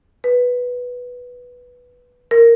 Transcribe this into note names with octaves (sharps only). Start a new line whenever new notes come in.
B4
A#4